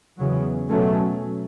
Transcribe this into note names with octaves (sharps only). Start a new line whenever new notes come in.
E2 C#3 F#3
B2 F#3 A3 C#4